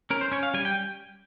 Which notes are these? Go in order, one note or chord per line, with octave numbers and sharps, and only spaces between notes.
C#4 A#4
C5
C#4 C#5
F5
G3 G#5
G5